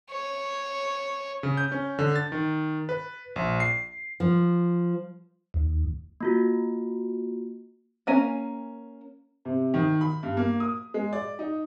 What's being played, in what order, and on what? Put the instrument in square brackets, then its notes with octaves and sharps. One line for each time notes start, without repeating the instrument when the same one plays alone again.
[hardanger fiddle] C#5
[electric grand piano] C#3
G6
C#4
D3
A6
D#3
B4
A#1
C7
[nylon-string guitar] F3
[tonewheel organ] D#2
[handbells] A#3 F4 F#4
[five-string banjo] A#3 C#4 G#5 A#5
[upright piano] C3
D#3
B5
G2
A#3
D#6
G#3
D5
D#4